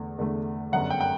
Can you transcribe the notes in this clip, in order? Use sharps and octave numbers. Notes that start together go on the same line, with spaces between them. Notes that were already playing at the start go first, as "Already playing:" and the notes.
Already playing: E2 D3 A3
E2 D3 A3
G1 F#2 D3 F#5
G5
G5